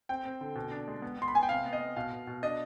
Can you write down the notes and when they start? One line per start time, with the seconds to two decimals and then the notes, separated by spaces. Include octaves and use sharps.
0.09 C4 G5
0.25 C4
0.41 D3
0.55 B2
0.71 D4
0.88 G#3
1.02 B3
1.18 B3 C6
1.28 B5
1.34 B3 G#5
1.43 G5
1.49 C3 F5
1.65 B3
1.73 D#5
1.80 B3
1.96 B2 F5
2.12 B2
2.27 B2
2.43 D4 D#5